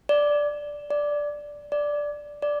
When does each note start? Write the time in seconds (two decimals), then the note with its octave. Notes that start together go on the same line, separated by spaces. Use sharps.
0.09 D5
0.90 D5
1.72 D5
2.42 D5